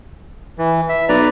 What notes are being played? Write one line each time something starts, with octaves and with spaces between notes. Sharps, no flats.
E3
E5
B1 B4 D5 A#5